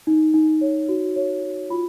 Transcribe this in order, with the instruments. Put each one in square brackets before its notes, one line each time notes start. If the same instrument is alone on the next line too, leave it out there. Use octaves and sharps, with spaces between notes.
[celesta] D#4
D#4
C#5
F#4
C#5
F#4
F4 B5